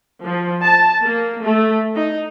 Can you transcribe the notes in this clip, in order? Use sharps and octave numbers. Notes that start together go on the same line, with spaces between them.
F3
A5
A#3
A3
D#4